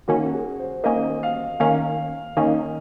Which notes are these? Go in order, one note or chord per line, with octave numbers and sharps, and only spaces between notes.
D#3 A#3 C#4 F#4
G#4
C5
D#3 A#3 C#4 D#5
F5
D#3 A#3 C#4 F5
D#3 A#3 C#4 D#5